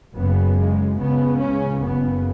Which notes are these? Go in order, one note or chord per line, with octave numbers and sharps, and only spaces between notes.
F#1 F#2 C#3 B3
G#3
C#2 C#3 B3
C#4
F#1 F#2 C#3 B3